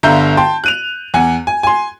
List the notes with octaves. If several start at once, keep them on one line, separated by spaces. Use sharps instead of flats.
G1 D3 E5 F5 A#5 G6
G5 A5 C6
F#6 D#7 F7
E2 F#5 G#5
G#5
G#5 C6